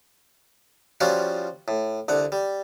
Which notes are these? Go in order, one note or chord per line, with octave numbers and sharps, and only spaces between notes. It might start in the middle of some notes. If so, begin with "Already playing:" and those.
F3 G3 C#4 F4 F#4
A2
C2 D3 F#5
G3